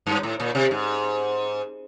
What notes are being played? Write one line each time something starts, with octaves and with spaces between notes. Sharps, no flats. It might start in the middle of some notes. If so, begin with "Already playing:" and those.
G2
A2
A#2
C3
G#2